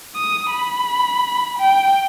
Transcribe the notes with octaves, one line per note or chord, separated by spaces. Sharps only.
D#6
B5
G5